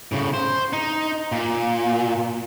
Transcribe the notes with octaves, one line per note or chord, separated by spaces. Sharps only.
A2 C#3
C5
D#4
A#2